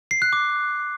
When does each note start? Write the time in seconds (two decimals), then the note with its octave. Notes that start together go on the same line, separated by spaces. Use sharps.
0.11 C7
0.22 F#6
0.33 D6